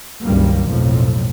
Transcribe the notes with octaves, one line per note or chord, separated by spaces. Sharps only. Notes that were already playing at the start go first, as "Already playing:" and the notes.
F#1 C#2 G2 D#3 G3 A#3
B1 F2 A2 F3